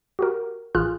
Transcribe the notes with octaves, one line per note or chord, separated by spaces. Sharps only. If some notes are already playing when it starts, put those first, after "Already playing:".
F#4 G4 A#4
A1 F4 G#4 F6 F#6